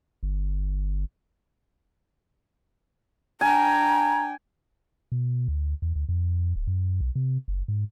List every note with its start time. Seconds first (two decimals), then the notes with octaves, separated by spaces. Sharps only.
0.23 G1
3.41 D4 G5 G#5 A#5
5.12 B2
5.48 D2
5.82 E2
5.96 D2
6.09 F2
6.56 D1
6.67 F#2
7.01 B1
7.15 C3
7.48 F#1
7.68 G#2